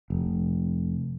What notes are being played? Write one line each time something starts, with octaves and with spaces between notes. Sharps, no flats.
F1